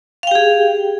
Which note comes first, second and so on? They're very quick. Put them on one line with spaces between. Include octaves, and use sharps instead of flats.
F5 G5 G4 G#4